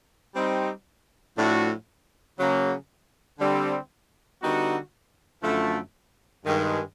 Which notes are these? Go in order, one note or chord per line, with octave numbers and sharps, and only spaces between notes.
G3 C4 D#4
A2 F3 A3 D4 F#4
C#3 F#3 A#3
D3 G3 C4
D3 G3 B3 D#4 F#4
F#2 D3 F3 A3
G2 D#3 G#3